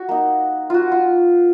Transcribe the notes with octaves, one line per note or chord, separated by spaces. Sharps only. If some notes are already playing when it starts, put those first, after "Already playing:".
Already playing: F#4
A#3 D#4
F4 F#4
F4